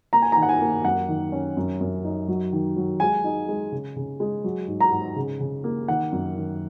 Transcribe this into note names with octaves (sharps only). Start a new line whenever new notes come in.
A#3 A#5
G#5
A#5
D#3
F#5
G#5
A#3
F#2 F#5
D#3
C#4
F#2
F#2
D#4
F#3
D#3
F#3
G#3 G#5
D#4
G#3
C#3
C#3
G#3
F#3
G#2
A#5
G#2
C#3
C#3
A#3
D#3 F#5
F#2
D#3